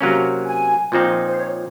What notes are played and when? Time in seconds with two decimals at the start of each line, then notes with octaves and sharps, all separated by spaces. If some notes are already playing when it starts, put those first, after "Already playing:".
0.01 C3 F#3 A#3 C#4 A#5
0.46 G#5
0.92 A#2 F3 C4 D#4
1.27 C5
1.38 C#5